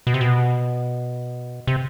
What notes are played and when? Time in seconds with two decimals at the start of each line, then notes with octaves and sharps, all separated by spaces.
0.07 B2
0.14 C3
0.21 B2
1.67 C3